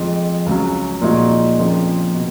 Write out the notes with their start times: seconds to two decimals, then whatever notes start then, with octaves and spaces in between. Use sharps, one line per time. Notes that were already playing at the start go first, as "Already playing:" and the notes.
Already playing: F2 F3 G#3
0.46 C#2 C#3 F#3
1.02 A#2 F3 G#3 D#4 F#4
1.58 F2 C#3 F3 A#3
2.15 B2